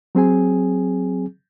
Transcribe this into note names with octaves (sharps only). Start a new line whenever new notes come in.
F#3 C4 G#4 G#5